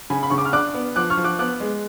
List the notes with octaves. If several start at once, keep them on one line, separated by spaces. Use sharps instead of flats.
C#3 G#5 B5
B5
C#3 C#6
D6
F6
D4 D6 F#6
B3
F3 D6 F#6
C#6 F6
F3
D6 F#6
B3 D6 F#6
G#3